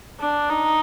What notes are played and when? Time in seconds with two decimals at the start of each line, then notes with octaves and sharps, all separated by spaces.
0.20 D4
0.49 D#4